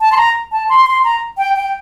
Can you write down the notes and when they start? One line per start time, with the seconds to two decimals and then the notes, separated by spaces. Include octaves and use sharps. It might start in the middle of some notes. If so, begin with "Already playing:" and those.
0.01 A5
0.12 C6
0.17 A#5
0.52 A5
0.69 C6
0.87 C6
1.04 A#5
1.38 G5
1.56 G5